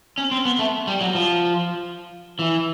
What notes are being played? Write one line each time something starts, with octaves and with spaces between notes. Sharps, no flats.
C#4
C4
B3
A3
G3
F#3
F3
E3